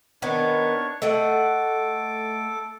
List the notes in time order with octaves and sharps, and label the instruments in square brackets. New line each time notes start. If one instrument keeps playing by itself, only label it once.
[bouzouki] D#3 B3 [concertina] D4 C#5
[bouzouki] A3 D#5 F#5 [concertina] A4 D6